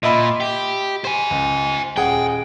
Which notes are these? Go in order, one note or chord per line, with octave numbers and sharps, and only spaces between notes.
A#2 D#5 E5 B5
G4
C5 G#5
C#2
D#1 G#4 F#5 G5